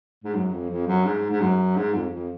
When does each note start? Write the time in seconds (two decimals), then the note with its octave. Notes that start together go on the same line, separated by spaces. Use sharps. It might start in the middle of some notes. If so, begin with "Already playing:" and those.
0.24 G#2
0.35 F#2
0.52 F2
0.70 F2
0.87 F#2
1.06 G#2
1.31 G#2
1.41 F#2
1.77 G#2
1.94 F2
2.11 F2